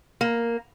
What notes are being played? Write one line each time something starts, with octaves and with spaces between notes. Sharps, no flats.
A#3